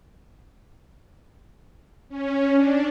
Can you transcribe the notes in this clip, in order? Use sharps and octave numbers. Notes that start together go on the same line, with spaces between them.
C#4
D4